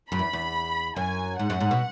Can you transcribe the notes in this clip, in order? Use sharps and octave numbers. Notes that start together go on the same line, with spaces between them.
F#2 B5
E2
E2
F#2 G#5
G#2 F#5
F#2
G#2
B2